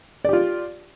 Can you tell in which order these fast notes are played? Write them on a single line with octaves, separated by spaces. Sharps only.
D5 G4 F4